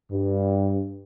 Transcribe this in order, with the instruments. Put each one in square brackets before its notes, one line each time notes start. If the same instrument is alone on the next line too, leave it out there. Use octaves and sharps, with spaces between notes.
[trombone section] G2